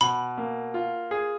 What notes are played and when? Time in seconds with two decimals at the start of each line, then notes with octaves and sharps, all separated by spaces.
0.01 B2 B5
0.38 A#3
0.74 F4
1.11 G#4